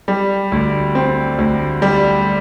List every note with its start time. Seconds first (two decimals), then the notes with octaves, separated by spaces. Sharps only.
0.08 G3
0.52 D2
0.95 C4
1.39 D2
1.82 G3